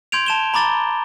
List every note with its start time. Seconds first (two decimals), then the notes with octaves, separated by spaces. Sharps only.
0.12 C6 G6 G#6 D7 F7
0.26 A5 E7 G7
0.54 A#5 B5 D6 A6 G7